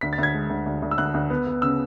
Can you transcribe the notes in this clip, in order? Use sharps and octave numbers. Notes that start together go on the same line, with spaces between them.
D2 B6
A6
D2 G#6
G#3
D2
D2
D2
E6
D2 F#6
D2
B3
B3
C#3 E6